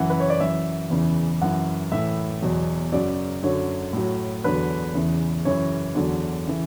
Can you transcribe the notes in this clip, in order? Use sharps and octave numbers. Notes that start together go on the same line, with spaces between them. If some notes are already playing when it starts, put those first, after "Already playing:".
Already playing: F#2 C#3 E3 F#5
B4
C#5
D5
F#2 E3 E5
E2 C#3 E3
F#2 E3 F#5
A2 E3 E5
E2 B2 F#3
F#2 C#3 F#3 D5
F#2 D3 F#3 C#5
A2 F#3
E2 D3 F#3 B4
E2 C#3 E3
F#2 C#3 E3 C#5
E2 D3 F#3
C#3 E3